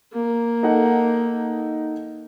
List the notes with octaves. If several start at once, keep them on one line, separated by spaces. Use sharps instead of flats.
A#3
D#4 A4 F#5